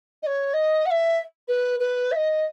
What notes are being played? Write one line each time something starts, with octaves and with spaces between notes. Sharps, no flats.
D#5
C#5
D#5
F#5
E5
B4
B4
E5
D#5